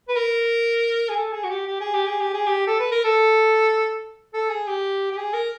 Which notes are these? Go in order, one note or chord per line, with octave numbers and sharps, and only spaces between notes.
B4
A#4
G#4
A4
G#4
F#4
G4
G4
G#4
G4
G#4
G4
G#4
G4
A4
B4
A#4
A4
A4
G#4
G4
G4
G#4
A#4